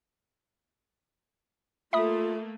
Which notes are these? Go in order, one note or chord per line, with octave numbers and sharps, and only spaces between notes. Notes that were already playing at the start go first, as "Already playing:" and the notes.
A3 A#3 F4 E5 B5 D#6